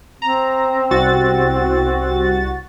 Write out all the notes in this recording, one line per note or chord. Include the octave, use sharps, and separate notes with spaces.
C4 A#5
C2 F#4 A6